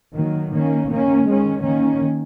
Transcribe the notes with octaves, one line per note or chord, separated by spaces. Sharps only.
D#3 F#3 A#3
D#3 A#3 C#4
D#3 A#3 C#4
D#3 G#3 C#4
D#3 A#3 C#4